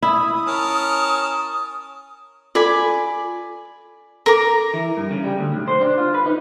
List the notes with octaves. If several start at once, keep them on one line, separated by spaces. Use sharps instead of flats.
E4 D#6
C#4 A#4 A5
F4 A4 D5 G#5 B5
A4 A#4 A#5 D6
E3
G2
C#3
G3
D2
B1
C5
D4
F4
B4
D#4